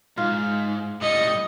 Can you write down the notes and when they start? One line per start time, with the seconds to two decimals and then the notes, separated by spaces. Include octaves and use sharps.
0.18 G#2 F4
1.01 A2 G3 D#5 C#7